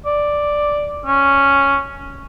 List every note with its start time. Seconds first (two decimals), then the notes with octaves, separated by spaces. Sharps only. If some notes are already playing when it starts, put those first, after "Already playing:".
0.06 D5
1.06 C#4